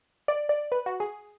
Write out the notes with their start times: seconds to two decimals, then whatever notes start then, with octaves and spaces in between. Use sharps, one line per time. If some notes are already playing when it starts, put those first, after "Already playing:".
0.28 D5
0.49 D5
0.72 B4
0.86 F#4
1.00 G#4